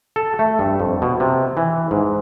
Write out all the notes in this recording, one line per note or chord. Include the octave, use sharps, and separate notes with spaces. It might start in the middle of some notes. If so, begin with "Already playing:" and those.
A4
A3
G2
F2
B2
C3
E3
G#2